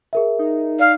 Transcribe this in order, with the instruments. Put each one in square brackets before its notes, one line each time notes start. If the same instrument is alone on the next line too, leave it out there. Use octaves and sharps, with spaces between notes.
[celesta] G#4 A#4 E5
[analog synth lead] D#4
[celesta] D5 [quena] F5